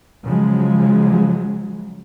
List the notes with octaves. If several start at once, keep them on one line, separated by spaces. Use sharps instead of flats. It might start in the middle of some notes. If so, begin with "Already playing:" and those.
C#3 F3 F#3 G#3